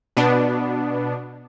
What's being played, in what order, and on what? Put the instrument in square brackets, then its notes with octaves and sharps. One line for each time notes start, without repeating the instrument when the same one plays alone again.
[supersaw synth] B2 B3 D4